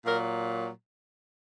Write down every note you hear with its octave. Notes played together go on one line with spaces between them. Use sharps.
A#2 F#3 A#4